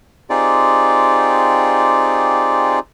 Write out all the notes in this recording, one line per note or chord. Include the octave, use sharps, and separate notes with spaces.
C4 D#4 F4 G4 G#4 D5